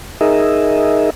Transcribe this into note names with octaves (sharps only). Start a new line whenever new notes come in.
D#4 G#4 A#4 D#5 E5